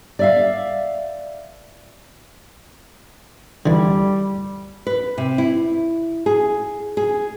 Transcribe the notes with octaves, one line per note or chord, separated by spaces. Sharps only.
D5 E5 F5
D3 E3 G3
B4
C3
E4
G#4
G#4